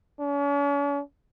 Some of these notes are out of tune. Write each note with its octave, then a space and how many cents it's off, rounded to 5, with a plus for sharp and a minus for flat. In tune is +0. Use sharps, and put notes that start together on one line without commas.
C#4 +45